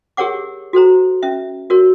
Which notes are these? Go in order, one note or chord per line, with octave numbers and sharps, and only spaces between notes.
G4 G#4 A#4 C#5 F#5 D6
F#4 A4 C5 A#5
C#4 E5
F#4 A#4 C#5